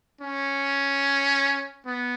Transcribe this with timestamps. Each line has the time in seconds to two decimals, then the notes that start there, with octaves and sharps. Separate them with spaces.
0.21 C#4
1.85 B3